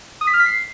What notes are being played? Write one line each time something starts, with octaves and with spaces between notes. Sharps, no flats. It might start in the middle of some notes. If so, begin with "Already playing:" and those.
D#6
B6
F6
B6
C7